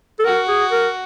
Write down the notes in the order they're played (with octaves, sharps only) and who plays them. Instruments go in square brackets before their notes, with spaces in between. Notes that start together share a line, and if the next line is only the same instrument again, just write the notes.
[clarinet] A4
[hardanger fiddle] F#4 [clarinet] A#4
[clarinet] G#4
A#4